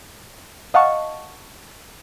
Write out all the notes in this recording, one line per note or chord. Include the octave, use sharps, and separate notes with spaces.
D#5 F5 F#5 A5 C#6